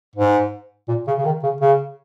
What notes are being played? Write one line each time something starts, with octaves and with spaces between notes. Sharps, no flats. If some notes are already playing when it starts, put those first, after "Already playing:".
G#2
A#2
C#3
C#3
D#3
C#3
C#3